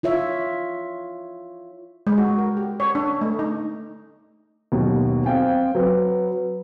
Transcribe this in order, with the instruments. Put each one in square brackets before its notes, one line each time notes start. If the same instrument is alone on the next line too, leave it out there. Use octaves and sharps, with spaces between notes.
[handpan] E4 F4 C#5 E5
[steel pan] G#3
F#4
A#4
G4
C#5
D4
A3
D#4
[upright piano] D#2 B2 F#3
[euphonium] C4 [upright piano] F5 G5 G#5
[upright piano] F#3 [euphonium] B4